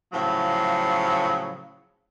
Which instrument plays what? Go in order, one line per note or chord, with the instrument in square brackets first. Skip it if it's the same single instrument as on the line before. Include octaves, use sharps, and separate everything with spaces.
[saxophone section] A2 C#3 F3 F#3